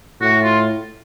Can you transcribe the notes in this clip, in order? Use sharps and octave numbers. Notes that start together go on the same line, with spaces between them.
A2 F#4
F4